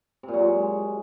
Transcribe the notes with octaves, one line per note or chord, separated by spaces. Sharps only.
C3
A#2
F#3
G#3